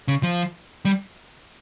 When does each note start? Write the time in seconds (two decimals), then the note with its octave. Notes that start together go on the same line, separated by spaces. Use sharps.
0.08 C#3
0.23 F3
0.85 G3